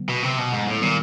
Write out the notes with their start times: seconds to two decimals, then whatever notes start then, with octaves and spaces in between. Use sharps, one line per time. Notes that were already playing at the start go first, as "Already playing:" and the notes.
Already playing: D3 F#3 B3
0.09 B2
0.23 C3
0.38 B2
0.52 G#2
0.67 A2
0.81 A#2 D#3 G3 B3